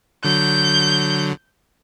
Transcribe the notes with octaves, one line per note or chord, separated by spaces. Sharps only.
D3 F#3 G6